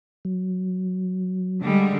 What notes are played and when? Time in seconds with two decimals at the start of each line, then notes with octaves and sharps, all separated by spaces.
0.25 F#3
1.61 D3 G3 G#3